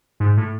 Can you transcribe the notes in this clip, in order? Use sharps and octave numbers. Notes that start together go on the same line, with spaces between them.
G#2
A2